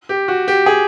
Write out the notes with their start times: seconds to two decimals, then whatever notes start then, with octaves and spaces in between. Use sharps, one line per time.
0.09 G4
0.28 F#4
0.48 G4
0.66 G#4